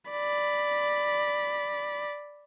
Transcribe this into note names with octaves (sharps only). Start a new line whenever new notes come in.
D5 B5